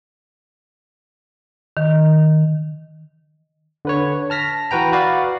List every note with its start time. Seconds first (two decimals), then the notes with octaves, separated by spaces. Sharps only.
1.77 D#3
3.85 D3 B4 C#5
4.30 A5 F6 A#6 B6
4.71 E3 F#4 B4 G5 A#5
4.92 F#4 B4 D5 F5